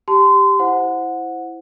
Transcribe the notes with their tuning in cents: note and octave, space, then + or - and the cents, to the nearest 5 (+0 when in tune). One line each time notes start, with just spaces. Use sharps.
G4 +0 A5 +0 C6 -30
E4 +0 C5 +0 F#5 -20